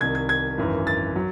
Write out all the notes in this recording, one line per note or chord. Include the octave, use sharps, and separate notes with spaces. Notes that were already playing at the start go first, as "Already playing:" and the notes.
C2 C3 D#3 G#6
G#6
G#6
G#1 F#2 E3
A6
F#3